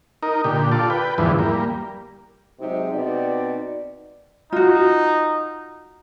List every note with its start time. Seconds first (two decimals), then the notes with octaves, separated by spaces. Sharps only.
0.23 D#4 A#4
0.44 A#2 D3 G4
0.71 F4 A4 D5
0.90 B4 G5
1.18 E2 G#2 D3 E3 F3
1.39 G3 A#3
2.60 C3 F#3 G#3 C4 D#4
2.93 B2 C4 D#4 D5
4.53 D#4 F4 F#4